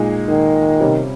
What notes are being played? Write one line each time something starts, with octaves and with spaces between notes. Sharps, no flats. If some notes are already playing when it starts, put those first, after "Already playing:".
Already playing: A#2 G#3 D#4 G#4
D#3
C3 G3 C#4